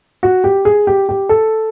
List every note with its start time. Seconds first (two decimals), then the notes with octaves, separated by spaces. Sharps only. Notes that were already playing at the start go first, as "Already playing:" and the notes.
0.23 F#4
0.44 G4
0.65 G#4
0.87 G4
1.09 G4
1.29 A4